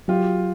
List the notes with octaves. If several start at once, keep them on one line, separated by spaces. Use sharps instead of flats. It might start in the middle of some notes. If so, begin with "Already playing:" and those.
F#3 F4 G4